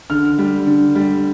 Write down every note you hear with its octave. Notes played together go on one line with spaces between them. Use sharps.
D3 F6
G3
D3
G3